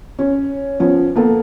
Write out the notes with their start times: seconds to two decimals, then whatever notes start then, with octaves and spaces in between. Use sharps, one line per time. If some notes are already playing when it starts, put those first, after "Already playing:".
0.19 C#4
0.80 F3 B3 C#4
1.16 A#3 B3 A4